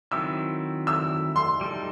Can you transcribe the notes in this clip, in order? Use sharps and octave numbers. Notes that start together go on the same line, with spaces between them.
D#3 F#3 C4 E4 E6
E6
C6
G3 D#4 A4